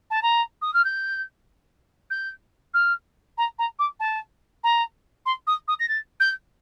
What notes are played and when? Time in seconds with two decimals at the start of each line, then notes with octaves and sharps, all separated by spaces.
0.10 A5
0.22 A#5
0.61 D#6
0.74 F6
0.84 G6
2.10 G6
2.74 F6
3.37 A#5
3.58 A#5
3.79 D6
3.99 A5
4.63 A#5
5.26 C6
5.47 D#6
5.68 D#6
5.79 A#6
5.88 A6
6.20 G6